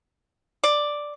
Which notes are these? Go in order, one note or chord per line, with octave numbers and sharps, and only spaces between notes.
D5